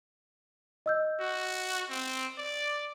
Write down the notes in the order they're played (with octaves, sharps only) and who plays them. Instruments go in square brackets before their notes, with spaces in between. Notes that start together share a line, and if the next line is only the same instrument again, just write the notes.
[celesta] D#5 E6 G6
[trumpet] F#4
C4
D5